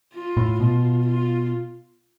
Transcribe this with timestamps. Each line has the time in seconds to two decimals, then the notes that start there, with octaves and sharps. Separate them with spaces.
0.14 F4
0.37 A2
0.60 B2 F4
1.06 F4